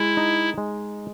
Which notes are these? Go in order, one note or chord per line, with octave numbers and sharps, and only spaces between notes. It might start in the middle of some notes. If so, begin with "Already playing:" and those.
Already playing: G#3 E4
D#4
G#3